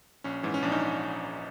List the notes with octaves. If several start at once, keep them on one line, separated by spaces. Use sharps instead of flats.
A#1 C#4
G#2 E3
C#4
A#1 D4
C#4 D#4